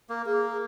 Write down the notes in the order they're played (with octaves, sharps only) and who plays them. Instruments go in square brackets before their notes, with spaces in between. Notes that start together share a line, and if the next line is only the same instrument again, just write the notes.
[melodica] A#3
[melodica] A#3 [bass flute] G#4